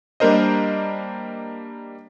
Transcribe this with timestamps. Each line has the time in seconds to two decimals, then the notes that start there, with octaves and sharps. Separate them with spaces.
0.20 G3 A#3 D4 A#4 C5 D#5